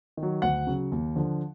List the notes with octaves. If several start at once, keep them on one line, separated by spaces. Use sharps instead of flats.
D#3
F#3
D2 F#5
C#3 F#3
D#2
D3 F3